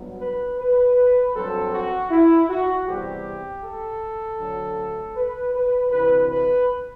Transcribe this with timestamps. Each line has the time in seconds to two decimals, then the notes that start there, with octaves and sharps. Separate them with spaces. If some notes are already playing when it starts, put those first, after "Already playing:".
Already playing: G2 F#3 B3
0.20 B4
0.59 B4
1.34 G2 F#3 C4 A4
1.72 F#4
2.10 E4
2.49 F#4
2.86 E2 C3 G3 C4 G4
3.63 A4
4.39 D2 D3 F#3 A3
5.15 B4
5.54 B4
5.91 D2 C3 E3 B4
6.29 B4